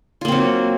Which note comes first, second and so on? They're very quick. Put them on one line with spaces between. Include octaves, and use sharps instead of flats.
F4 A#3 C4 F#3